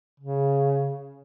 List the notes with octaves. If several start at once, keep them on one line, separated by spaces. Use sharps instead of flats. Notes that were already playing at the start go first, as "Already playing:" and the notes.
C#3